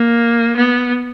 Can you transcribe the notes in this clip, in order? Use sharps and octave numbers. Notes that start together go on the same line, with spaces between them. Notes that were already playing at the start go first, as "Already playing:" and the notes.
Already playing: A#3
B3